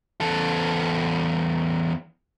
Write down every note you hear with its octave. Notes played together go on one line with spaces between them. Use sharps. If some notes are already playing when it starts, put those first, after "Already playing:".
E2 A4